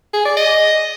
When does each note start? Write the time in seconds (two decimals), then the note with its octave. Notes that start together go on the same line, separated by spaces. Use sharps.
0.14 G#4
0.25 D5
0.37 D#5